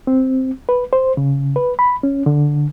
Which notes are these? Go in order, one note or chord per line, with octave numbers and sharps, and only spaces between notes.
C4
B4
C5
C#3
B4
B5
C#4
D3